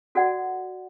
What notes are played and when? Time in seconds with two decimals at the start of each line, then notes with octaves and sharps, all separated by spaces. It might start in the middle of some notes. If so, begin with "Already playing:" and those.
0.15 F#4 A4 D5 F#5